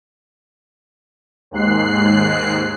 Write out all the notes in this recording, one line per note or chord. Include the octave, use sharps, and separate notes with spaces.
D#2 G#2 F#6 C7